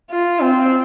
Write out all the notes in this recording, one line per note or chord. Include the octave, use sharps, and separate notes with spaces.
F4
C4